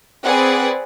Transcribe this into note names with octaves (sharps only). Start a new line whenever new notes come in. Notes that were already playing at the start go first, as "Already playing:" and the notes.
C4 G#4 B4 D5 F#5